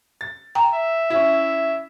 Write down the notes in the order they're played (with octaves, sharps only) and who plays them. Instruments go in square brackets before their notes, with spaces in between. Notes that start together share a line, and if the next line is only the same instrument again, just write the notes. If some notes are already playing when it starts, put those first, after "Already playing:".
[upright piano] A6
[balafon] G5 A#5
[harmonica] E5
[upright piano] C#4 E4